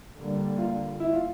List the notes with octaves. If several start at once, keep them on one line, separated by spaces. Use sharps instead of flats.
D3 G3 A#3
F4
E4
F4